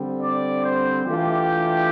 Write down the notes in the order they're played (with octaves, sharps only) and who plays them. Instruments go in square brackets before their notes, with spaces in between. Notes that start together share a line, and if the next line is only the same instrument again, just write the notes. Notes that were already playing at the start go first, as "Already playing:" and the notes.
Already playing: [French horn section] D3 G3 C4
[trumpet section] D5
C5
[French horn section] E3 A3 D4 F4 [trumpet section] G4